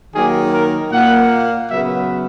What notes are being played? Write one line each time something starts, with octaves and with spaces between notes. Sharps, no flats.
D#3 F#3 A#3 G#4
A#4
A#2 A#3 F#5
C#3 F#3 B3 E5